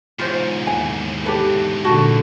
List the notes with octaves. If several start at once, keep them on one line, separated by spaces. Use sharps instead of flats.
E2 G#2 F4 C5 C#5
D#2 G#5
G4 A4 B4
A#1 D3 F#4 A5